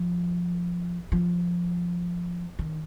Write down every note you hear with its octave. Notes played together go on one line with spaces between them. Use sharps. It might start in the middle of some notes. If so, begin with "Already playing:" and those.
Already playing: F3
F3
D#3